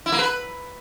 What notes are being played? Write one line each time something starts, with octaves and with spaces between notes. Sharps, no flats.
E4
A#3
B4